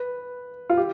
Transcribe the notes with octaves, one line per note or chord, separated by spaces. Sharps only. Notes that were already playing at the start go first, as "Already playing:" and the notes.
Already playing: B4
F4
G4